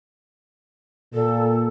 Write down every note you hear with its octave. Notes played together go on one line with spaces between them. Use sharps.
A#2 A4